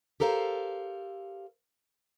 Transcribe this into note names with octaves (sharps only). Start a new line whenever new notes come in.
G4 A4 A#4 C5 F5